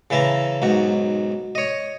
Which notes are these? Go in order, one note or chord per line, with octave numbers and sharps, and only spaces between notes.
C#3 E3 E5 A5 A#5
B1 G#2 F#4
C#5 D#5